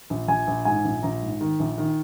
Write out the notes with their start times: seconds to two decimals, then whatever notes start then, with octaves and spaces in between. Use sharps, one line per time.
0.10 A#1
0.28 A#1 G#5
0.47 A#1
0.65 G#2 G#5
0.85 A#1
1.03 A#1 A#5
1.22 G#2
1.41 D#3
1.60 A#1
1.78 D#3